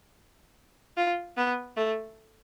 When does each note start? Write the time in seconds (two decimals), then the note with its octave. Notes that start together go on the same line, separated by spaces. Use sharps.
0.97 F4
1.37 B3
1.76 A3